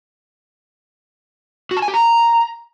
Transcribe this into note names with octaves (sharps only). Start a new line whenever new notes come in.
F#4
A5
G#5
G4
A#5